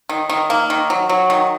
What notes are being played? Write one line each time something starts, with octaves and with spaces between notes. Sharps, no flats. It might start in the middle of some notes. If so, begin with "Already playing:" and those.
D#3
D#3
A#3
D#3
F#3
F#3
D#3